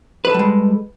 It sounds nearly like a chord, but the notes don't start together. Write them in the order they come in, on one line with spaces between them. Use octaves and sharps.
B4 A4 G3 G#3